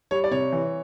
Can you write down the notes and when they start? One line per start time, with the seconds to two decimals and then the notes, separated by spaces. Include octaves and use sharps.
0.11 G3 C#5
0.24 D5
0.31 C3 C#5
0.52 E3